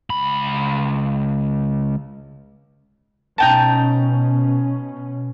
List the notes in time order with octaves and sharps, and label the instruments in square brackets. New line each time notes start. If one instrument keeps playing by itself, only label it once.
[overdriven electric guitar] C#2 B5
[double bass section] B2 C#4 [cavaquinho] D#4 G5 A5